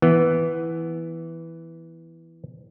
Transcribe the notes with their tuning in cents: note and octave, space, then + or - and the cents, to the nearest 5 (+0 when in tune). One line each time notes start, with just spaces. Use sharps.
E3 +0 B3 +0